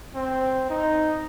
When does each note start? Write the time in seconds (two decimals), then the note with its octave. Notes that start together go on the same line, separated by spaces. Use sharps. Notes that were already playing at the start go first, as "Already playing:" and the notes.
0.15 C4
0.70 D#4